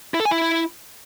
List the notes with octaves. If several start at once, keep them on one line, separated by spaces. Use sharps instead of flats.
E4
A4
G#5
E4